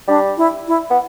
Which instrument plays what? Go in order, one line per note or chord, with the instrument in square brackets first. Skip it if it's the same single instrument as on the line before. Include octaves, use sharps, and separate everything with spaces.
[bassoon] G3 [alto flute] D4
[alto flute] E4
E4
[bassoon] B3